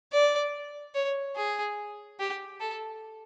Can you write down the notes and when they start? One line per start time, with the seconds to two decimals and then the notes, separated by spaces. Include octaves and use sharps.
0.13 D5
0.95 C#5
1.36 G#4
2.19 G4
2.60 A4